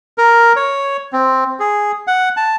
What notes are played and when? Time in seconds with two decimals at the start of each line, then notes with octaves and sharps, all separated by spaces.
0.18 A#4
0.56 C#5
1.13 C4
1.59 G#4
2.07 F#5
2.37 A5